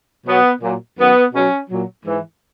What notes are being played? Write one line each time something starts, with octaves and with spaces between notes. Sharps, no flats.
B2 F#3 B3
A#2 F#3
F#2 D#3 F#3 B3
B2 F#3 C#4
A#2 F#3
G#2 E3